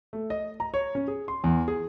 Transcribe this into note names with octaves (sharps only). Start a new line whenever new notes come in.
A3
D#5
A#5
C#5
C#4
G#4
C6
E2
G#4